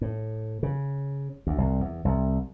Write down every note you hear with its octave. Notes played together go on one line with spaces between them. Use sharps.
A2
C#3
D2
C2
E2
C2